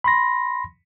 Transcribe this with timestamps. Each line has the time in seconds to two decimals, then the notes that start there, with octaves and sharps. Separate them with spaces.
0.04 B5 C6 A#6